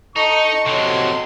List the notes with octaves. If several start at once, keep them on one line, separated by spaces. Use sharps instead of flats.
D#4 A4 D#5 A5 C#6
C3 F#3 C6